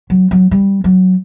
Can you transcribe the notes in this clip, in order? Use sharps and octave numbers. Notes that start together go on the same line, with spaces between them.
F#3
F#3
G3
F#3